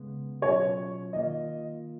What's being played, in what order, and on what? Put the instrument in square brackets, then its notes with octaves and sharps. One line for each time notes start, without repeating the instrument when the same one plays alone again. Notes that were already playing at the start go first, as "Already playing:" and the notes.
Already playing: [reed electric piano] C#3 G#3 B3
[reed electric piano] B2 F#3 C#4 F4 [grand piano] C#5
[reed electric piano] D#3 A#3 F4 [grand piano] D#5